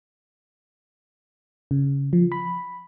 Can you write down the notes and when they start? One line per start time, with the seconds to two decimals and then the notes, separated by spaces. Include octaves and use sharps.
1.71 C#3
2.13 F3
2.32 B5